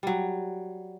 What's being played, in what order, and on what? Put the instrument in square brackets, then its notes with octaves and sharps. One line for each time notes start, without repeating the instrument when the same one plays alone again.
[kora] F#3 G3